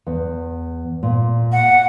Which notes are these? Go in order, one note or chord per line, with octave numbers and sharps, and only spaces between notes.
E2
A#2
F#5